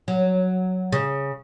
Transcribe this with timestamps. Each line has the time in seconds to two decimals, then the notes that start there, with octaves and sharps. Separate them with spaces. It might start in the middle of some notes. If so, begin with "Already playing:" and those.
0.08 F#3
0.92 C#3